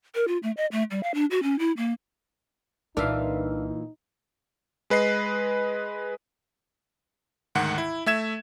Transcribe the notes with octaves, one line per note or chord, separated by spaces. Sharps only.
A#4
F4
A3
D#5
A3
G3
F5
D4
F#4
C#4
E4
A#3
C2 A#2 E3 D4 D#4 A#4 E5 F5
G#3 B4 D#5 C7
D2 G#2 D#3 F#5
E4
A3 E5 G#6 E7